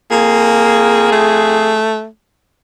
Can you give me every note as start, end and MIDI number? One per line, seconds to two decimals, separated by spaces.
0.11 1.81 41
0.11 1.09 58
0.11 1.81 68
1.12 2.06 57